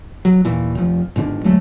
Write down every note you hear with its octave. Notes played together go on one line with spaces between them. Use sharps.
F#3
D#2 A#2 E3
F1 F3
G1 G#2 D#3 D4
D2 F#3 G#3 A3